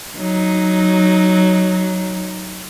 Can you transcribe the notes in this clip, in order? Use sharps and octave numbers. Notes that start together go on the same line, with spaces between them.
F#3 D#4